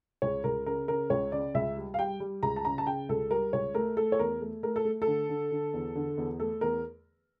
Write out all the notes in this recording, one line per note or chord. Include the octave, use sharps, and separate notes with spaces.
C#2 C#5
C#2 A#4
C#3 A#4
C#3 A#4
C#2 C#5
C#3 D5
C#2 E5
G3
F5
G3 G5
G3
C#2 A#5
A5
C#3 A#5
A5
C#3 G5
C#2 A4
G3 A#4
C#2 C#5
A3 A#4
A3 A4
C#5
E2 A#4
A3
A3 A#4
A4
A3
A4
D3
D3
D3
E2
D3
E2
A3 A4
E2 A#4